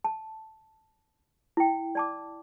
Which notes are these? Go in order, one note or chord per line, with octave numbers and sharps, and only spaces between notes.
A5
E4 G5
D5 A5 D6